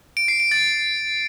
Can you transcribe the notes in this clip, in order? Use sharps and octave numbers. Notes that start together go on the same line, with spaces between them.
D7
C7
D7
A6